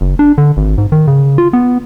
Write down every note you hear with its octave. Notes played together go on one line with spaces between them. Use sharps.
F#1
D4
D3
G#1
G#2
D#3
C#3
F4
B3